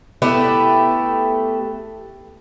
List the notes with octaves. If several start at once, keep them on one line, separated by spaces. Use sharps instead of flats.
A3 B3 E4 G4